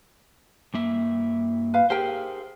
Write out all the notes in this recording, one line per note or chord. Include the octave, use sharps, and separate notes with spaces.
G2 A#3 E5
B4 F5
G4 G#4 A#4 C5 G5